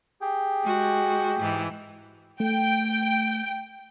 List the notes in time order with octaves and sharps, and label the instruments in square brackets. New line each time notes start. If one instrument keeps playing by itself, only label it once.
[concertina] G4 G#4 G5
[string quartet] G#3 F#4
G#2 E3
[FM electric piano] A3 [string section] G5